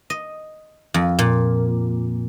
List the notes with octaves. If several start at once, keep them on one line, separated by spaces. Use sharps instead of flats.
D#5
F2
A#2